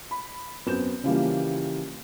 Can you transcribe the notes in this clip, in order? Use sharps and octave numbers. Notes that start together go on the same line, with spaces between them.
B5
F#2 B3 C4 G6 E7
C#3 E3 F3 G3 A#3